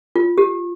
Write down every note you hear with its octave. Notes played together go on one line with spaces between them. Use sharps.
F4
G4